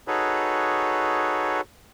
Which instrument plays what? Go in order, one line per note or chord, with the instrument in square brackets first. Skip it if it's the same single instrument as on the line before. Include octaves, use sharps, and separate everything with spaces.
[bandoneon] D#4 F#4 G#4 A4 B4 C#5